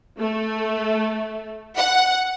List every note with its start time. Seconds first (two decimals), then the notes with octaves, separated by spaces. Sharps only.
0.20 A3
1.77 F#5